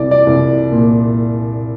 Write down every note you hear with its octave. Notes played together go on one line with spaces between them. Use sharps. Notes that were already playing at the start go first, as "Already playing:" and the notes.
Already playing: C2 D5
D5
C2
A#2